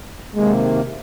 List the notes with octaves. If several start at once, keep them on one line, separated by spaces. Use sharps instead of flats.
C3 D#3 G#3 A#3